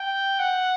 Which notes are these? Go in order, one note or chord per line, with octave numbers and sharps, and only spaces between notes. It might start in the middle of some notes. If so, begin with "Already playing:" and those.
Already playing: G5
F#5